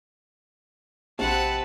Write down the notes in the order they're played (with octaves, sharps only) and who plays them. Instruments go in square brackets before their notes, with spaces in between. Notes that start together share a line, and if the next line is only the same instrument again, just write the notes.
[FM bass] A#1 [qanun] C3 F#4 [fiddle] C4 F#5 [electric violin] B4 A5